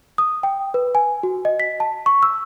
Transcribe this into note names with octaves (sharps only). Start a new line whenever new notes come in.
D#6
G5
B4
G#5
F#4
D#5
B6
A5
C#6
E6